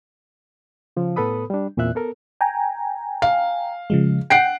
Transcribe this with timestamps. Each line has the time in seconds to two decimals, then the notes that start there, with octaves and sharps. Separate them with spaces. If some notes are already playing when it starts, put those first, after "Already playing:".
0.97 C#3 F3
1.16 A2 B3 A4 B4 B5 D#6
1.50 G3 D4
1.77 E2 A#2 E3 C4 E5 F#6
1.95 B3 A4 A#4
2.41 G5 G#5 A#5
3.22 F5
3.90 C#3 F3 G#3
4.30 F#5 G5 C7 D7